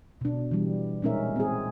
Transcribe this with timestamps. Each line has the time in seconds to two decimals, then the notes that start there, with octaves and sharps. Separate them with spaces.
0.21 B2 D4
0.51 E3 G3
1.02 A#2 G#3 C#4 D#4 A#4 E5
1.36 C4 G#4